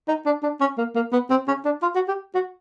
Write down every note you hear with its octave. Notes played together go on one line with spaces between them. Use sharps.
D#4
D4
D4
C#4
A#3
A#3
B3
C4
C#4
D4
F4
F#4
G4
F#4